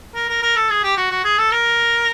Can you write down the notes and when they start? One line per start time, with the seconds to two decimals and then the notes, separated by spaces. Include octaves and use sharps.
0.15 A#4
0.29 A#4
0.42 A#4
0.56 A4
0.70 G#4
0.84 G4
0.97 F#4
1.11 F#4
1.25 G#4
1.38 A4
1.52 A#4